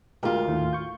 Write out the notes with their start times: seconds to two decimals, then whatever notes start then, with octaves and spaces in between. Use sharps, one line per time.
0.23 D2 G#3 F4 G4 A#4
0.48 D#2 A2 D#3
0.73 C#6 G6